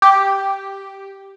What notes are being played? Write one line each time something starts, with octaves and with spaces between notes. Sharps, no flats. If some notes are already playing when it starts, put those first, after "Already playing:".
G4